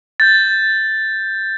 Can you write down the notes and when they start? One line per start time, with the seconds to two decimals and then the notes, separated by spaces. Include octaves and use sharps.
0.20 G6 A6